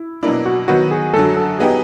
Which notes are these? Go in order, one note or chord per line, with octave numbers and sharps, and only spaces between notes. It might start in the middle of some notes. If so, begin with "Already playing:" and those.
Already playing: E4
B2 F#3 A#3 D4 E4
F#4
D#3 F#3 B3 F#4
G#4
F#2 D3 F#3 A4
A4
F#3 B3 D#4 G4 G#4